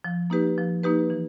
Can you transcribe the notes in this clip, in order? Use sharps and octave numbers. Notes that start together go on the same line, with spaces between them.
F3
A#3 D#4 G4 B4
F3
A#3 D#4 G4 B4
E3